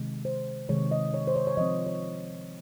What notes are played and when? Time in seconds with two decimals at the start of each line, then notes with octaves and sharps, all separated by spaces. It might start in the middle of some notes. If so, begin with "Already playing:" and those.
Already playing: C3 D#3 G#3
0.25 C5
0.69 C3 D#3 G#3 C#5
0.91 D#5
1.14 C#5
1.27 C5
1.36 C#5
1.47 C#5
1.57 F3 C4 D#5
1.87 C#5